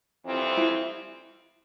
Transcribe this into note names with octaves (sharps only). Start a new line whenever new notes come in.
F2 E3 G3 C4
E4